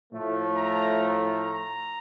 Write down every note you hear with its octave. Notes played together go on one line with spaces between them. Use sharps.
A2 F3 A3
A#5
A#5
A#5